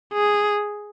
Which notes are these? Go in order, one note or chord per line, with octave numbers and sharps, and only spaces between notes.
G#4